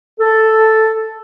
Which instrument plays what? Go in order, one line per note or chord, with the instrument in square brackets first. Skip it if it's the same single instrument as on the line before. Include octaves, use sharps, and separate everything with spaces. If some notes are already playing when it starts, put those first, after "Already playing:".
[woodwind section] A4